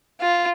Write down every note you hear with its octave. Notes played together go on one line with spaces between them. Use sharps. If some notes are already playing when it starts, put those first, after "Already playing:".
F4